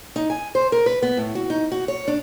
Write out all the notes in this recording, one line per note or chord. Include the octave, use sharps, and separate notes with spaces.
D#4
G#5
C5
A#4
B4
B3
A2
F#4
D#4
F#4
C#5
D4